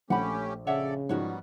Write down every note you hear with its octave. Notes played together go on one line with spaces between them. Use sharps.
A#1 A3 C#4 G4 F#5 B5
C#3 A4 C#5 D5 E5 F#5
G#2 D#3 F3 G3 B3 C#4 F#4 C#5